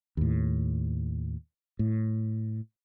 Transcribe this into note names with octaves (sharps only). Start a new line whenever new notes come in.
D#2 A2
A2